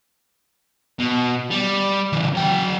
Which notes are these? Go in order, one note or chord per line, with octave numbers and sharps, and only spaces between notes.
B2
G3
C#3 E3
F#3 G5